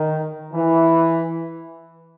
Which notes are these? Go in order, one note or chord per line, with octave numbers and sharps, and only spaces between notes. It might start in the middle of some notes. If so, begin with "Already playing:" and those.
Already playing: D#3
E3